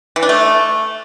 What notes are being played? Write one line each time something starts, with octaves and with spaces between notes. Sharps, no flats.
E3
D4
A3